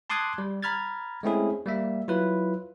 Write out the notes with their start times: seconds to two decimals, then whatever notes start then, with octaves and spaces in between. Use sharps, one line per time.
0.10 A5 C6 D6 D#6 F#6 G#6
0.38 G3
0.63 A#5 B5 F6 G#6 A6
1.23 G#3 A3 C4 C#4 E4 G#4
1.66 G3 A#3 E5
2.08 F#3 E4 F4 B4